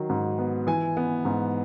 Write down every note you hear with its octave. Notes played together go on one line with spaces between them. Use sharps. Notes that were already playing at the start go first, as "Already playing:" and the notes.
Already playing: D#3 F#3
G#2
B3
E3 G#5
B3
G#2